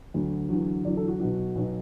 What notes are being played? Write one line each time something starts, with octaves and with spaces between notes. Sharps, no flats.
D2 D3 F#3 D4
E2 D3 F#3
E2 D3 F#3 D5
A4
F#4
B1 B2 F#3 F#4
B1 B2 F#3